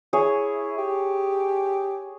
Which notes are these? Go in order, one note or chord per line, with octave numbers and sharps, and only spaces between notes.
E4 G#4 C#5
G4